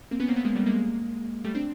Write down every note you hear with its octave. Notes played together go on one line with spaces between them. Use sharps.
A#3 C4
B3 C#4
A#3 C4
A3 B3
G#3 A#3
G3 A3
G#3 A#3
G3 A3
C4 D4